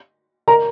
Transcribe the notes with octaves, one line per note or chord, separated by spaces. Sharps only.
A#4 A#5